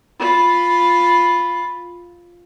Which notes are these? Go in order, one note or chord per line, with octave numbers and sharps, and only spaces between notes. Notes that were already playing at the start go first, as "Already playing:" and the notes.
F4 B5